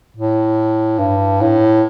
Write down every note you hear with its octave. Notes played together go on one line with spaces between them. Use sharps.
A2
G2
A2